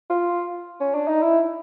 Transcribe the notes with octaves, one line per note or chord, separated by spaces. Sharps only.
F4
C#4
D4
D#4
E4